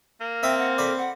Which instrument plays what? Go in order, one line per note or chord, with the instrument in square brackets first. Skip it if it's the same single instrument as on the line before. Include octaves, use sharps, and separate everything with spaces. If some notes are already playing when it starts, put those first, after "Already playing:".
[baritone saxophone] A#3
[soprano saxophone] C4 [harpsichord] E5 A#5 D#6 [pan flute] G5
[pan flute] F#5
[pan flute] A4 [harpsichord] D5 B5
[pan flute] F#5